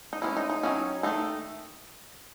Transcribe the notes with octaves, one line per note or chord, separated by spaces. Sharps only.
D#4
E3 G#3 C#4 E4
D#4
D#4
D#3 F#3 C#4
D#3 A3 D#4